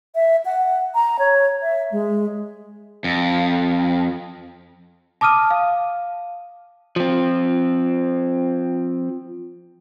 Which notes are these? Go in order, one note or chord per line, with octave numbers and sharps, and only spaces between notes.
E5
F#5
A#5
C#5
E5
G#3
F2
A5 D6 D#6 F6 D#7
F5
F3 C4